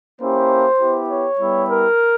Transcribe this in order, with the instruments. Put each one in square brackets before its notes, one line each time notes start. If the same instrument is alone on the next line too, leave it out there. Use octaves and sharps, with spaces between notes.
[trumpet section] A#3 C#4 E4 G4 C5
B3 E4 G4
C#5
G3 B3 E4 G4
A#4